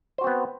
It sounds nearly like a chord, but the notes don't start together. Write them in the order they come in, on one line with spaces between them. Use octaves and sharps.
C5 F#4 C4 B3